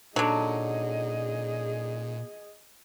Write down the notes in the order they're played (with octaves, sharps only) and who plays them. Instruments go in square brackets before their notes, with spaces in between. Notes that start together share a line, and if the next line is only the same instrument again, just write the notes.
[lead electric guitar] A#2 [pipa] D3 F#3 [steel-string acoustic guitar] C#4 D#4 A4 [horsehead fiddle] G#4 D#5